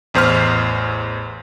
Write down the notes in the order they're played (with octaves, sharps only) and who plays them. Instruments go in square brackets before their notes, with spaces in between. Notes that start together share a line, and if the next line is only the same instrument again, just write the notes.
[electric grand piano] A1 E2 C5 C6 F6